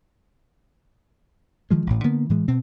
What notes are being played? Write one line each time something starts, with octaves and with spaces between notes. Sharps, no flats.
D#3 F3 G#3
A1 A2
D3 A#3 B3
A2 E3 G#3
B2 C4